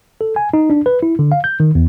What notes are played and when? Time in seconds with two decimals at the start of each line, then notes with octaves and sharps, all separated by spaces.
0.21 A4
0.36 G#5
0.54 D#4
0.70 D4
0.86 B4
1.03 E4
1.19 D3
1.32 F5
1.44 G6
1.60 D#3
1.75 E2